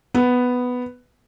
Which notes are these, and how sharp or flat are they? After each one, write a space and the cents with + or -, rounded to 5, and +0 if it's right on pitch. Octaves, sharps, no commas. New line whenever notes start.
B3 +5